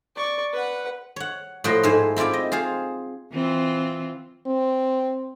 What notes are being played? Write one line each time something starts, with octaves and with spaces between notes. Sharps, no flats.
D5 C#6
B4 F#5
C#5 F#5
A2 F3 F#4 D#5 G5 C6
G#2 A3 E4 C5 G#5
C4 E4 F4 D5 G5
D#5
F4 G#4 C5 F5
E3 C4 F4
C4